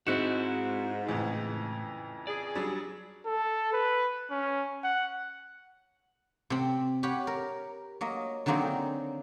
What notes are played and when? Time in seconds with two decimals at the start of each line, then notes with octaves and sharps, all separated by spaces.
0.07 G#2 C4 E4 F#4 F#6 C#7 E7
1.08 F2 A2 C#3 E3
2.27 G#4 D5
2.55 F#3 G3 D4
3.26 A4
3.73 B4
4.31 C#4
4.83 F#5
6.50 C3 C4
7.03 G4 B4 C#5 F#5
7.27 A#4
8.01 F#3 A#3 D#5
8.46 D3 D#3 F#3 A#3 C4 G#4